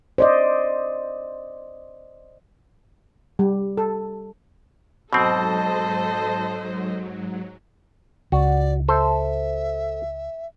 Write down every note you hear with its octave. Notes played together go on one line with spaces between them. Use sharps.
C5 D5 D#5
G3
A4
G#2 B2 F#3 C4 A4 C5 D#5 A5
C#2 F#4 D5
A4 C5 E5